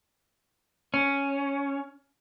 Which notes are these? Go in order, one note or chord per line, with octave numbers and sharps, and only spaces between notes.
C#4